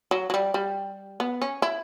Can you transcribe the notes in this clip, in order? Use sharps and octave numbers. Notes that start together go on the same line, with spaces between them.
F#3
F#3
G3
G3
B3
C#4
E4